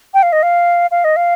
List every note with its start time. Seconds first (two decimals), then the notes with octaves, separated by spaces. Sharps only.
0.14 G5
0.23 F5
0.32 D#5
0.43 F5
0.91 F5
1.04 D#5
1.16 F5